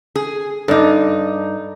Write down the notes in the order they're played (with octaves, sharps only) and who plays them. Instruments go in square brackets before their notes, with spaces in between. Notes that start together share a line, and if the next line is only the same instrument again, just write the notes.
[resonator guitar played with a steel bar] G#4
[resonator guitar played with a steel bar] G2 D#4 [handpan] A4 D5